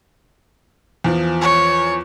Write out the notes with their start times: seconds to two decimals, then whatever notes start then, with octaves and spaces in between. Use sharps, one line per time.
1.04 E2 F3
1.41 C#5